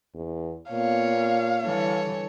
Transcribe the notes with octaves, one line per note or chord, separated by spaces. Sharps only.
E2
A#2 B3 C#5 F5
D3 E3 G3 A4 C#5